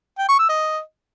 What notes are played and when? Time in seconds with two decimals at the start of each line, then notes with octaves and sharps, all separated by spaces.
0.19 G5
0.29 C#6
0.39 E6
0.49 D#5